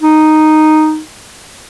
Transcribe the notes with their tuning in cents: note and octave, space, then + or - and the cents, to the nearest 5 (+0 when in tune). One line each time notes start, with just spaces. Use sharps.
D#4 -5